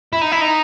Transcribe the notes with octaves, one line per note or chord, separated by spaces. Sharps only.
E4
D#4
E4
D#4